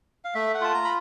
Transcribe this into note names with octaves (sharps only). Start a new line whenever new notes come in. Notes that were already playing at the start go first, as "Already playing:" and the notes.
F5
A3 E5
F#5
F4 A5
A#5
B5